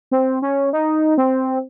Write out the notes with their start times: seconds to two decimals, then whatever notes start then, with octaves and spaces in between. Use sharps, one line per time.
0.11 C4
0.42 C#4
0.73 D#4
1.18 C4